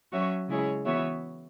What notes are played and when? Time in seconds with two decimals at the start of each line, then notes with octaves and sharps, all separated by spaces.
0.12 F#3 C#4 F#4 C#5 E5
0.49 C#3 G#3 E4 G#4 C#5
0.86 E3 B3 F#4 C#5 E5